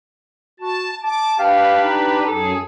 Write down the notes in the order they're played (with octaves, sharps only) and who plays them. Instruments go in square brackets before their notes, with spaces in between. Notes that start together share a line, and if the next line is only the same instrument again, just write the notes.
[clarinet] F#4 [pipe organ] A5
[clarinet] A5 [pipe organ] D6
[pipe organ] D4 B4 [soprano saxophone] G4 [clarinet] F5
[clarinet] D#4
[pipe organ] F#2 G#4 [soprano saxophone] A4